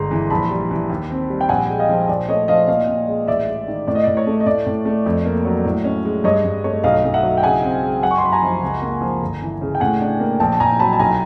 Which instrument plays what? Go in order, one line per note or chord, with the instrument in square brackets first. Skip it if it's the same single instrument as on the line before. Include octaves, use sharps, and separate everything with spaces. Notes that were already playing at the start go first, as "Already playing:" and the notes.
Already playing: [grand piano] G1 G#3 [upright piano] A#5 C6
[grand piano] E3
[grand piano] A#1 [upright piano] A5 B5
[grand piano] G3
E3
D#2
C4
G3
[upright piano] G5
[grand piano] A#1 [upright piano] F#5 G#5
[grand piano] G#3
[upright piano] D#5 F5
[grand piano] F3
[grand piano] A#1 [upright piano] D5
[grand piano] A3 [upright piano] C#5 D#5
[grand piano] F3 [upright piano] D#5 F5
[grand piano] A#2 [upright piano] D#5 F5
[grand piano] A#2
G#3
[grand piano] A1 [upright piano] D5 E5
[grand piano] G#3
D#3
[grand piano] A2 [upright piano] D5
[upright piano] D#5
[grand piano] A2 [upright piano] D5
[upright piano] C#5
[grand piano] A3
[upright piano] D#5
[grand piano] A2 [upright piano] D5
[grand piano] A2
A3
F2
A#3
F#3
A2
C#4
G#3
[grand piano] G2 [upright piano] C#5 D#5
[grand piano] G2
[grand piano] A3 [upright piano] C#5
[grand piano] B1 [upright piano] D#5 F5
[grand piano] B1
[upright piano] E5 F#5
[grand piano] F#3
[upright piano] G5
[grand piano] C#3 [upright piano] F#5 G#5
[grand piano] C4
G#3
[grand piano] F#2 [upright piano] F#5 G#5
[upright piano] C#6
C6
[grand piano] F#2 [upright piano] B5
[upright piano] G#5 A#5
[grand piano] F3
C#2
A#3
F3
G1
E3
C#3
[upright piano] G5
[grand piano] A2 [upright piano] F#5 G#5
[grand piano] D4
A#3
[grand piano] A#1 [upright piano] G5 A5
[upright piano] A5
[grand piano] A#1 [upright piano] G#5 A#5
[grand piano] F#3 [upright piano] A5 B5
[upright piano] A5
[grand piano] B1 [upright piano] G#5 A#5